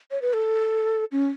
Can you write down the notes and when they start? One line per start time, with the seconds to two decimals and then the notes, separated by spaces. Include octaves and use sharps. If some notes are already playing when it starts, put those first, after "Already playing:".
0.11 C#5
0.22 B4
0.33 A4
1.12 C#4